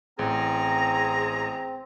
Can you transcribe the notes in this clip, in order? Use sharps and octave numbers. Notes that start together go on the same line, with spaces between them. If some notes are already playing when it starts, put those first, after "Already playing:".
A1 C4 G#4 A#5